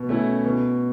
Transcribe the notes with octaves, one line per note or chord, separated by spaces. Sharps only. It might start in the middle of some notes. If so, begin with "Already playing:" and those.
Already playing: B2
A3 C#4 E4
B2